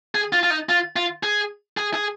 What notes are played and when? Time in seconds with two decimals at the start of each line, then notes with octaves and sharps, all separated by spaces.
0.15 G#4
0.33 F4
0.43 F4
0.50 D#4
0.69 F4
0.96 F4
1.23 G#4
1.77 G#4
1.94 G#4